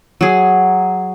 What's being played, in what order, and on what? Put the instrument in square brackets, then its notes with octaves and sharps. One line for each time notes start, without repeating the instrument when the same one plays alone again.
[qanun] F#3 G#4